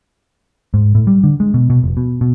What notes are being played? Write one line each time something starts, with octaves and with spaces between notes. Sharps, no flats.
G#2
A2
G3
D3
G#3
B2
B2
F1
B2
B2